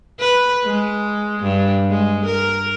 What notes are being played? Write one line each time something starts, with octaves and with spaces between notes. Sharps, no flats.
B4
G#3
G2
G#3
A#4